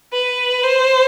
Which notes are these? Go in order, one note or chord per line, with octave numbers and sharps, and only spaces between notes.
B4
C5